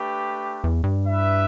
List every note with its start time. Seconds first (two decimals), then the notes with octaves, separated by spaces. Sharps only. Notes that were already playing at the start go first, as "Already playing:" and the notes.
Already playing: A3 D4 G4 B4
0.64 E2
0.84 G2
1.04 E4 B4 E5